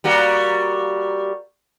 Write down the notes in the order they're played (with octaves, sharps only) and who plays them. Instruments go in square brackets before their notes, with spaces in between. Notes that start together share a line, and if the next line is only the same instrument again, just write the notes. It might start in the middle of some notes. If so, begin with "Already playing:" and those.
[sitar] G3 A#3 F#4